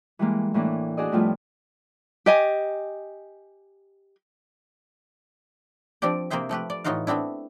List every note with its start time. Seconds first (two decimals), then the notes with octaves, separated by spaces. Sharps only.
0.19 E3 G3 G#3 A#3
0.54 A2 E3 A#3 D4
0.97 D4 F#4 G#4 D5 D#5
1.12 A2 F3 G3 A3 B3 F4
2.26 G4 D#5 G#5
6.02 F3 C4 D4 G4 D5
6.30 C3 A#3 C4 G#4 C5 E5
6.49 F3 A3 G4 B4
6.70 D5
6.84 A2 E3 D#4 F4 F#4 F5
7.07 A3 B3 C4 D4 E4